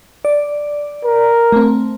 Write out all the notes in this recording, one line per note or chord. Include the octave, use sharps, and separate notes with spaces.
D5
A#4
A3 C4